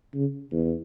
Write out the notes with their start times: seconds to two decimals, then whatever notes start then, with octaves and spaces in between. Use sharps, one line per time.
0.14 C#3
0.52 E2